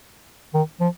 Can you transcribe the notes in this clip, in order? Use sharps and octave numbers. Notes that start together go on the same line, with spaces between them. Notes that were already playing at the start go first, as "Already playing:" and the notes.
D#3
F3